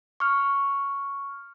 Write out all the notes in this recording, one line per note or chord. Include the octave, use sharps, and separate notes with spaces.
C#6 F6